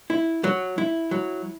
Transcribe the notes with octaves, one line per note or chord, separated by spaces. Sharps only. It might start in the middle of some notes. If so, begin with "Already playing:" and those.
E4
F#3
E4
F#3